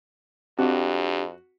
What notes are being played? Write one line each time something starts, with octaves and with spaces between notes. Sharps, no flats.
F2 C4 D4 F#4 G4